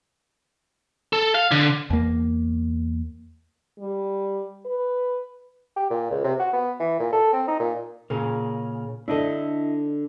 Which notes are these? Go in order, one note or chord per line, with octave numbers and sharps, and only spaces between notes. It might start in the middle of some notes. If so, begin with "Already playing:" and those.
A4
F5
D3
E2 A#3
G3
B4
G4
A#2
C#2
C3
F#4
B3
E3
A#2
A4
C4
D#4
A#2
A#2 C#3 G#4 A#4
D3 D4 E4 D#5